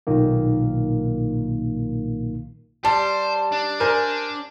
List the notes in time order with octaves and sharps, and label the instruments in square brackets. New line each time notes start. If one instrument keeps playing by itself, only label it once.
[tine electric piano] B1 A#2 D#3 A#3
[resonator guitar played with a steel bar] G3 [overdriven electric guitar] C5 [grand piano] A5
[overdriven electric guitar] D4
[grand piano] A#4 C5 G#5